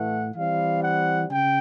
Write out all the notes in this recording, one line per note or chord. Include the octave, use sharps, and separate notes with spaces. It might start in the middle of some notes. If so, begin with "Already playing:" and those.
Already playing: A2 E3 A3 F#5
E3 G3 C4 F5
F#5
C#3 G5